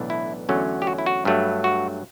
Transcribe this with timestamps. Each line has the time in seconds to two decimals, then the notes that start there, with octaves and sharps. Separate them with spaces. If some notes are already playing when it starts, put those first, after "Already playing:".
Already playing: B1 A2 E3 B3 D4
0.10 E4
0.49 E2 D3 F#3 A3 C#4
0.82 G4
0.87 F#4
0.98 E4
1.06 F#4
1.25 G2 F#3 A3
1.64 F#4